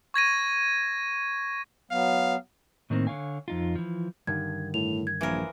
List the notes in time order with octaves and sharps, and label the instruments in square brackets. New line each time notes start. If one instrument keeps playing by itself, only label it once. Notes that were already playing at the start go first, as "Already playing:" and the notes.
[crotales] C#6 G#6 A#6 D#7
[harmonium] F#3 B3 [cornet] F5
[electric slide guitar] A2 D#3 A#3 C4
D3 C#5 F5 G#5
F2 D#4 F4
E3 F3
[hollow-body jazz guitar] G2 D3 D#3 [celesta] G#6
[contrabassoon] A2 [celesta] F7
[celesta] G#6
[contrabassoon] A#1 [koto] E3 F3 A#4